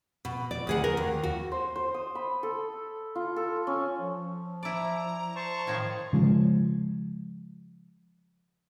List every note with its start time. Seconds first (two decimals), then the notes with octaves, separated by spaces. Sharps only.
0.25 B2
0.51 D5
0.67 D2 G#4 F#5
0.84 A#4
0.97 D#2
1.24 F#4
1.52 C5
1.76 C5
1.94 D#6
2.15 B5
2.43 A4
3.15 F4
3.36 A4
3.67 C#4
3.98 F3
4.63 E4 D5 A#5
5.36 C5 A5 C#6
5.67 A2 D#3 F3 D#4 G#6
6.13 C#3 F3 G#3